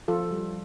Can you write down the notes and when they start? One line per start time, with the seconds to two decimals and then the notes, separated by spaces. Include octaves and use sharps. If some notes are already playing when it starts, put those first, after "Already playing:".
0.08 F3 F4 A4
0.31 G3